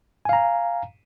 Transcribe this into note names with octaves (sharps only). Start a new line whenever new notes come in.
F5 G#5 A#5